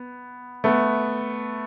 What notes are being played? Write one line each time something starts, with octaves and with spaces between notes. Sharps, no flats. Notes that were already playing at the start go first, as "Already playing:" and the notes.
Already playing: B3
A3 B3